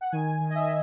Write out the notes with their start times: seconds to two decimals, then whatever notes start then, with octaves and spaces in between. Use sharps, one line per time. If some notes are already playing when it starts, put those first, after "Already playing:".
0.01 F#5
0.12 D#3 G#5
0.41 D#3
0.50 D#5
0.55 E5